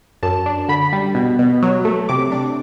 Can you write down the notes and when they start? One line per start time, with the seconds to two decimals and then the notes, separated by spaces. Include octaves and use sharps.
0.23 F#2 A5
0.46 D4
0.69 D3 B5
0.93 G3
1.15 B2
1.39 B2
1.63 F#3
1.85 A3
2.09 C3 D6
2.32 D4